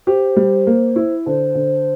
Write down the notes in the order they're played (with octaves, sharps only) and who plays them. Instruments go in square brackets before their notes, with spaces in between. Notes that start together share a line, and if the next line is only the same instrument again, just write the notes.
[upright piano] G4 [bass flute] C5
[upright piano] G3
A#3
E4
[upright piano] D3 [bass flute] C5
[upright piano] D3